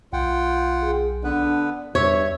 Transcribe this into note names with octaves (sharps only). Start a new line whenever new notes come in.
B1 F4 F#5 G5
G#4
D3 B3 D4 B4
E2 G2 C#5 E5